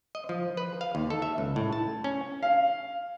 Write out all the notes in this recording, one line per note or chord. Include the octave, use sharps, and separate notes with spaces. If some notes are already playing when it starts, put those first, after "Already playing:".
D#5
F3
B4
F5
D#2
A4
E5
C#2
A2
A5
C#4
F5